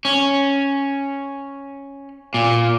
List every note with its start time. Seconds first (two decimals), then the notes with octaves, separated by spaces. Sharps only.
0.05 C#4
2.34 A#2